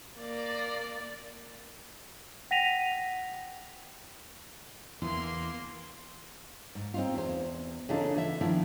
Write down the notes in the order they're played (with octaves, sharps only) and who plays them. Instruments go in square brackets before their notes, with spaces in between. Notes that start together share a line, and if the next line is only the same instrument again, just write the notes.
[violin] A#3 D5
[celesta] F#5 G5 A#6 B6 D#7 F7
[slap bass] E2 E3 [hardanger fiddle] A#3 C6
[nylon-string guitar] G#2
C4 D#4 F4
E2 C5
C#3 E3 D4 D#4 F4 A4
E3 E5
D#3 F3 B3 D4 E4